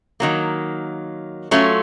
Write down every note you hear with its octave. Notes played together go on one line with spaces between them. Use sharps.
D#3 F#3 A#3
F#3 A3 C#4 F4